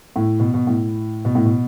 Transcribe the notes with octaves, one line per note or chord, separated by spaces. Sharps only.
A2
B2
B2
A2
B2
A2
B2